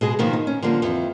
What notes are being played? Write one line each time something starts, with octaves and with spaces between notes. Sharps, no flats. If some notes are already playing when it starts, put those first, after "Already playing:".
B2 G#3 G#4
B2 D#3 F3 A#3
D#4
C#4
D3 F3 G3 A#3
F2 E3